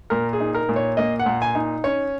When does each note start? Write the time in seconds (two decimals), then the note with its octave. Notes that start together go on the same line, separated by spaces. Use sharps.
0.10 A#2 A#4
0.33 G#4
0.40 D#4
0.55 A#4
0.69 A#2
0.76 C#5
0.97 A#3 D#5
1.19 F#5
1.26 A#2
1.42 G#5
1.55 D#4
1.84 C#4 C#5